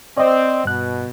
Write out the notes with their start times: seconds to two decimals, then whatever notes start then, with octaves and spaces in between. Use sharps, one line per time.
0.17 C4 D5 D#5
0.65 G2 B2 F#6